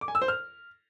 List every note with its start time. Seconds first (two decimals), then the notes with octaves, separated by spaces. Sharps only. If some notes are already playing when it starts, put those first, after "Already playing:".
0.01 D6
0.08 G#5
0.15 E6
0.22 C5
0.28 F6